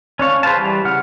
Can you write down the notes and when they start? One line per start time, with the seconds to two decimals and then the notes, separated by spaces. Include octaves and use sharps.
0.19 C#4 D4 C#5 F5
0.43 G#4 B4 C5 F5 A5
0.57 E3 G3
0.85 C#3 F#5 F6